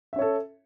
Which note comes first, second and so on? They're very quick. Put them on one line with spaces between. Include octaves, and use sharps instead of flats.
E5 C#4 C#5 A4